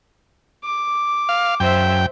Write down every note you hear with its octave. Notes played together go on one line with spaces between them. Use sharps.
D6
F5
F#2 C5 E5 G5